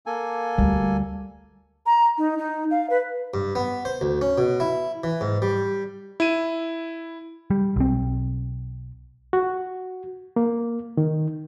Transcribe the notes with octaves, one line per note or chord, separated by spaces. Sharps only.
A#3 A4 G#5
D2 G3
A#5
D#4
D#4
F5
B4
G2
B3
C5
D2
C#4
B2
E4
E3
G#2
G3
E4 D#7
G3
B1 C4
F#4
A#3
D#3